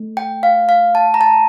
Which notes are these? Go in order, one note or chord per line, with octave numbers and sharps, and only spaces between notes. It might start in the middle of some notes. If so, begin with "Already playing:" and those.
Already playing: A3
G5
F5
F5
A5
A#5
A5